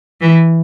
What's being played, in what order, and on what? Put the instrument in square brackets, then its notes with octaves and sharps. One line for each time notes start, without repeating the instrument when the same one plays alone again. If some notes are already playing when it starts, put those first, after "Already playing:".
[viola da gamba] E3